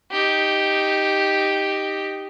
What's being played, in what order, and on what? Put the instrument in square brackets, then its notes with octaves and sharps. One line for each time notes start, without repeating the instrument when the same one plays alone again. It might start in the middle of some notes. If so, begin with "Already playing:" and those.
[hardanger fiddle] D#4 G4